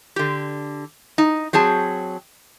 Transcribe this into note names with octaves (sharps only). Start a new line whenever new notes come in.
D3 G4
D#4
F#3 C4 G#4 A5